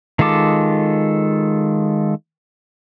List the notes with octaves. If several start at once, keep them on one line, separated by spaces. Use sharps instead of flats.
D#3 G#3 F4 A4 D6